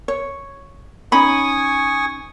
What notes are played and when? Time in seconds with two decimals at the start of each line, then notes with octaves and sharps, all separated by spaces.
0.08 C#5
1.12 C#4 D#4 G#5 B5 C#6 D#6